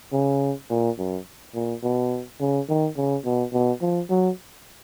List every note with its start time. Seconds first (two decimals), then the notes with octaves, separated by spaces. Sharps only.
0.13 C#3
0.70 A#2
0.98 F#2
1.55 A#2
1.83 B2
2.40 C#3
2.69 D#3
2.97 C#3
3.24 B2
3.53 B2
3.81 F3
4.10 F#3